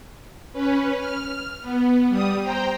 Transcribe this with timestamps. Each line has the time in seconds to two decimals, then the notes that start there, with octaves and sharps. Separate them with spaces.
0.53 C#4 B4
0.97 F6
1.61 B3
2.09 G3 D#6
2.42 C5 G5 A#5